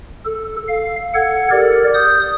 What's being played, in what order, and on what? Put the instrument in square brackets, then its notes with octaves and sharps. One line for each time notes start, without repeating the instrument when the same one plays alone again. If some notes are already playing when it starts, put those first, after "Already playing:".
[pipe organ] A4
F5
A4 F#5 G#6
G4 A#4 D5
D#6 G6